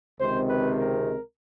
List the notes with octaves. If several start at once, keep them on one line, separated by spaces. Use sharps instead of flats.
C#2 C3 D#3 G#3 C4 C5
B4
A#4